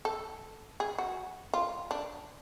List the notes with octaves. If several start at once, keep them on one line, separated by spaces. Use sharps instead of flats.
A4
G#4
F#4
F4
D4